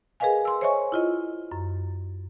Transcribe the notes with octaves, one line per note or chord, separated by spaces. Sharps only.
G#4 A#4 B4 D#5 F5 G#5
C6 E6
C5 C#5 D#5 E5 G#5 C#6
E4 F4 D#5
F#2